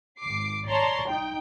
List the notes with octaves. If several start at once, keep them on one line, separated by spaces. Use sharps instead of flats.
G#1 D6 C7
C#5 D5 A5 A#5 C6
D#4 G5